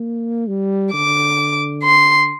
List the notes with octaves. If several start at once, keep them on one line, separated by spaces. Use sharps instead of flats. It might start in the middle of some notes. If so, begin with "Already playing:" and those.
Already playing: A#3
G3
D3 D6
C6